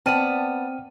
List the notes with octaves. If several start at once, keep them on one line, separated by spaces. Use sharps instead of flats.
B3 C4 C5 D5 G5 A5 F6 D#7